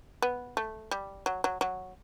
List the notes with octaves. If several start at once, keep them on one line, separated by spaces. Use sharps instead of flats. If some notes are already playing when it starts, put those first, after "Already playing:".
B3
A3
G3
F#3
F#3
F#3